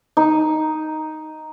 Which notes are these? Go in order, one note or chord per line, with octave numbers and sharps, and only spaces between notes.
D#4